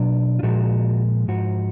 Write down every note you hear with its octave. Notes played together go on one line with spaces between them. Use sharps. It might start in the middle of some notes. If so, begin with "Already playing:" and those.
Already playing: B2 F#3 D4
F4
A#2 F3 G#3 F#4
G#2 F3 F#4